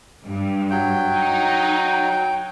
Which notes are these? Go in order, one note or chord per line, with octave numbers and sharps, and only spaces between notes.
G2
F#3 G5
D#4
G5